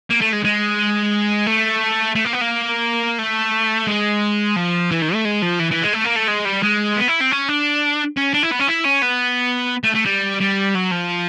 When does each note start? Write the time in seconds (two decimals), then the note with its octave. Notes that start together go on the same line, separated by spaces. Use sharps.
0.10 A#3
0.21 A3
0.32 G#3
0.44 G#3
1.47 A3
2.15 A3
2.25 A#3
2.33 B3
2.41 A#3
3.19 A3
3.87 G#3
4.56 F3
4.91 E3
5.02 D#3
5.14 A3
5.25 G#3
5.42 F3
5.60 E3
5.72 E3
5.83 G#3
5.93 A3
6.05 A#3
6.16 A3
6.28 G#3
6.45 G3
6.62 G#3
6.96 B3
7.08 E4
7.20 C4
7.31 C#4
7.48 D4
8.17 C#4
8.34 D4
8.43 E4
8.52 B3
8.60 C#4
8.69 E4
8.85 C#4
9.03 B3
9.84 A3
9.95 A3
10.06 G3
10.41 G3
10.75 F#3
10.92 F3